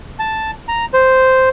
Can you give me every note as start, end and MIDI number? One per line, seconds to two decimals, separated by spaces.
0.19 0.51 81
0.68 0.85 82
0.94 1.49 72